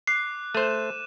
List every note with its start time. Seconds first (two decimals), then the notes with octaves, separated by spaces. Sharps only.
0.07 D6 F#6 C7
0.55 A3 C5 D#7 E7